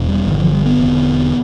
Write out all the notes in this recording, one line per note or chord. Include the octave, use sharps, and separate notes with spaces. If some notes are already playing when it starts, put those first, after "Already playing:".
Already playing: E1 E2 B2
G3
G1 G2 D3 E3
F3
G3
B3
E1 E2 D3